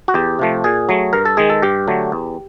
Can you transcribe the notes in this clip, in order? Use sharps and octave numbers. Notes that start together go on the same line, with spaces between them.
F#4
E2 G4
C3 F3 A3
A#2 G#4
F#3 A3
G2 A#4
A4
D#3 G#3 G#4
A4
G2 G4
D3 F#3 A3
E2